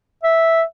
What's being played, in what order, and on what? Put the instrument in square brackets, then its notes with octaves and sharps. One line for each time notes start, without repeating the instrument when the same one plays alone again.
[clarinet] E5